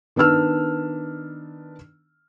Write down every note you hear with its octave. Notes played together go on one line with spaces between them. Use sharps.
D#3 B3 D4 E6 F6